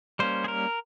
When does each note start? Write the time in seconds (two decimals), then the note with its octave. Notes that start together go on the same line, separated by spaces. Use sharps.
0.19 G3 A#3 C#4 C5
0.44 G#4
0.48 A#4